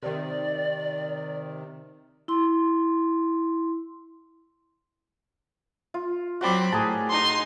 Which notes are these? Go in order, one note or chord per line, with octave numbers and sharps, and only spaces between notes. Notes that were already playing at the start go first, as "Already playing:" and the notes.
C3 D#3 D5
E4 C6
F4
F#3 C4 F#4 D5 B5
A2 G#4 A#4 A5
D#4 C6